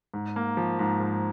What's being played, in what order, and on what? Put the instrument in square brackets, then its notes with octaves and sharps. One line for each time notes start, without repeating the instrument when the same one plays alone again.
[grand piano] G#2
A#3
F3
G#2
G#2